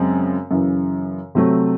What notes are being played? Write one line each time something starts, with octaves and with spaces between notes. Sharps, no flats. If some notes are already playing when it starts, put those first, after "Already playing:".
Already playing: F#2 C#3 G#3 C4
F#2 C#3 E3
C3 F#3 A3 C4